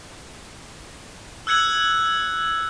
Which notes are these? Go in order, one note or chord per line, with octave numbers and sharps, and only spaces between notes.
E6 F#6 G#6 C#7 F#7